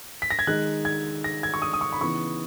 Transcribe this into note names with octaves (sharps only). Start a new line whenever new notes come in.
B6
A#6
G#6
D#3 G#3 D#4 F#6
G#6
A#6
G#6
C#6
D#6
D#6
C#6
B5
C#3 E3 B3 D#4 C#6